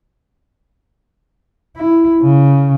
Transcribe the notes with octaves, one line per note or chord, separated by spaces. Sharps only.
E4
C#3